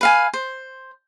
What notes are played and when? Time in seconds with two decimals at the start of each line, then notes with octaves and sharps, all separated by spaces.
0.01 B4 F5 G#5
0.34 C5